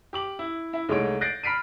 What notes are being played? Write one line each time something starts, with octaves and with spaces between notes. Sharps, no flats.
G4 D6 F#7
E4
E4 E5
C2 G#3 A3 D#4 C#5 D7
F#6 G6 A6 A#6 C7 D7
B5 F6 B6 C7 D7 D#7